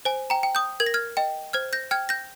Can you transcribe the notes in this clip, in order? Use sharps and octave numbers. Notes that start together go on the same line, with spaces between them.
C5 G#5
G5 A#5
G5
D#6 G6
A#4 G#6
A#6
F6 G#6
D#5 G5
C5 F6 G#6
G6 A#6
G5 F6 G#6
G6 A#6